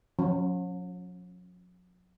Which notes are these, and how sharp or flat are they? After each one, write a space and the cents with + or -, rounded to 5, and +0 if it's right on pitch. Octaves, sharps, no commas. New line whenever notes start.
F#3 -45 C#4 +0